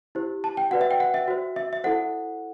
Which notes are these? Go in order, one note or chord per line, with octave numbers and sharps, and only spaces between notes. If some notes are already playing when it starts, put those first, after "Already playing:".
E4 G4 C5
A5
G5
F#4 B4 D5 F#5
E5
G5
F#5
E5
F#4 C5
E5
E5
E4 A4 C5 F#5